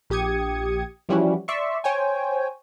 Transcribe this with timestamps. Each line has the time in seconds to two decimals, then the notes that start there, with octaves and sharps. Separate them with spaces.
0.10 A#1 G4 D#6 G#6 C#7
1.09 E3 F3 G3 C#4 E4 F#4
1.48 D5 E5 C6 C#6
1.84 C5 C#5 G5 G#5